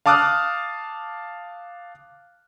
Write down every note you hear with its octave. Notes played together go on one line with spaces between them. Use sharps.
F5 A5 D6 D#6 F6 F#6